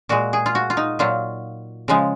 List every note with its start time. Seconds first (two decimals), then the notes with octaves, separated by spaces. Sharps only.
0.09 A#2 G#3 F#4
0.33 G#4
0.46 F4
0.55 F#4
0.70 F4
0.77 D#4
0.99 A#2 F#3 F4
1.88 C#3 F3 G#3